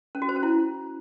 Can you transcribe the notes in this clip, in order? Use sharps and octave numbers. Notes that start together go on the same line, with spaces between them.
C#4
F#4
C5
C#4
E4